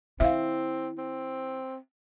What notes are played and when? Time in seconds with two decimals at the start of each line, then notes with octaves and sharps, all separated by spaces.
0.20 D#3 C4 E4 E5 F5
0.98 C4